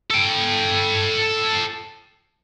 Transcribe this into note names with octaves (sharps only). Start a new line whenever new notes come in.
A4 G5